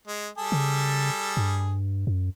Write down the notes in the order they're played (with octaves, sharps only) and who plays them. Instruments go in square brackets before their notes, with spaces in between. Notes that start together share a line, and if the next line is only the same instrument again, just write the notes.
[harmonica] G#3
G3 G#4 A4
[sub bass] C#3
G2
F#2